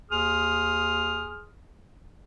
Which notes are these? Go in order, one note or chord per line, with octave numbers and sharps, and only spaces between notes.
D#2 G#4 C6 D#6 F6